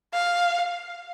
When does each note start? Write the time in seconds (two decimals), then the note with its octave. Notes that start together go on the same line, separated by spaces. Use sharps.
0.13 F5